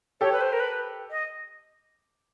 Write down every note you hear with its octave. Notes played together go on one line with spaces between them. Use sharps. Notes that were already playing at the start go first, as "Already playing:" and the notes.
G4 A4 C#5
B4
C5
A#4
B4
D#5